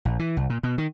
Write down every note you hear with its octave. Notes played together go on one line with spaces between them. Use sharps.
A#1
E3
C2
A#2
B2
D#3